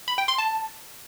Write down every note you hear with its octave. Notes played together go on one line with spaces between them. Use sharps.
B5
G5
C6
A5